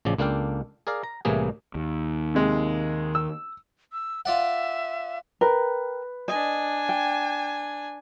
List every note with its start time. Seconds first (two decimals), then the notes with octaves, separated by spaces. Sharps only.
0.05 A1 C#3 F3 D5
0.18 C#2 A#3 D4 A4 F5 G5
0.87 G#4 A#4 D5 F5
1.03 A#5
1.25 C2 A2 C3 E3 A#3 G#4
1.75 D#2
2.35 C3 G#3
3.15 E6
3.92 E6
4.25 F4 D5 E5 F#5
5.41 A#4 B4 G5
6.28 D4 D#5 G#5
6.89 G5